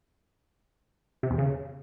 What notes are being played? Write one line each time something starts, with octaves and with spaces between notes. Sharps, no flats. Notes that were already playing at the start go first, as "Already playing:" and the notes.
C3
E2
C#3